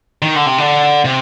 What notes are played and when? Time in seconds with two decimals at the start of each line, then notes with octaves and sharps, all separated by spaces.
0.22 D#3
0.35 D3
0.46 C3
0.58 D3
1.05 C3